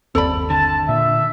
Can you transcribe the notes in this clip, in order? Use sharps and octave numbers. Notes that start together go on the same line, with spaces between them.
G1 D#2 C4 A4 D5 B5
D3 A5
A#2 E5